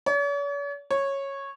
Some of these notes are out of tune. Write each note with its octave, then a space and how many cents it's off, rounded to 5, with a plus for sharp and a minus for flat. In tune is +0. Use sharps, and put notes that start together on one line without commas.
C#5 +45
C#5 -10